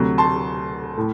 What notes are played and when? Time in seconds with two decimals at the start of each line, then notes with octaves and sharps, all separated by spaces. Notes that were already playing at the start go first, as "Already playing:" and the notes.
Already playing: D2 C3 F#3
0.18 A5 C6
0.98 A2